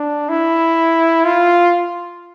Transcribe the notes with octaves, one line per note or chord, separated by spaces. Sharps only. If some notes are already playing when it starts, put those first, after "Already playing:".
Already playing: D4
E4
F4